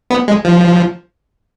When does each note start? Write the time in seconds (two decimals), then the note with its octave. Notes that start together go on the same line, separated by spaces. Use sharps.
0.10 B3
0.28 G#3
0.45 F3